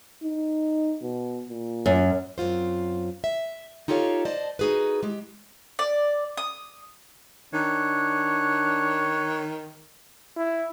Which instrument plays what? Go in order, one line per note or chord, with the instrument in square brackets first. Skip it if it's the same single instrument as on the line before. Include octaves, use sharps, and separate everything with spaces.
[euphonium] D#4
B2
A#2
[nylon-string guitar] F#2
[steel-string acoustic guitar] F#2 C4 F4 C5
E5
D#4 F4 G4 A4 C#5 F5
C5 D5 D#5 A5
D#4 F#4 G#4 A4 B4
G#3 G4
[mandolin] D5
D#6
[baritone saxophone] D#3 [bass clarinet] D4 [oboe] C#5 [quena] F#6
[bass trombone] E4